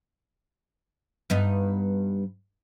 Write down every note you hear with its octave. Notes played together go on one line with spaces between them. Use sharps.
G2 B3 D#4